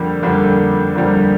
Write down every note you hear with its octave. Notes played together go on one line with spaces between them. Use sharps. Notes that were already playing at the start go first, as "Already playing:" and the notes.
Already playing: F2 D3 G3 A#3
F2 D3 G3 A#3
F2 D3 G3 A#3